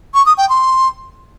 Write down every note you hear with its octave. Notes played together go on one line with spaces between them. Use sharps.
C#6
D#6
G5
C6